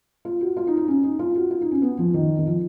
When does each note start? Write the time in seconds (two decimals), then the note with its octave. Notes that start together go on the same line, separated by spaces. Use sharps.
0.25 F4
0.41 F#4
0.57 F4
0.67 D#4
0.77 D#4
0.88 C#4
1.04 D#4
1.19 F4
1.36 F#4
1.51 F4
1.61 D#4
1.71 C#4
1.82 B3
1.99 F3
2.14 D#3
2.39 D#3
2.46 F3